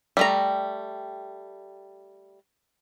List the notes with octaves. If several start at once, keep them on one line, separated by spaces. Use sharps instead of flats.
G3 A3 A#5